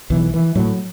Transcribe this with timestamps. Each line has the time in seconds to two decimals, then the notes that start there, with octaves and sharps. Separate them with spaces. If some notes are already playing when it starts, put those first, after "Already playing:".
0.10 B1 E3
0.34 E3
0.55 A2 F#3